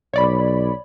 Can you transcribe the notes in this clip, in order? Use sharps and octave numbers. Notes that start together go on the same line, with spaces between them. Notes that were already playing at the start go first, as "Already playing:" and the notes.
B1 C#5 D5 B5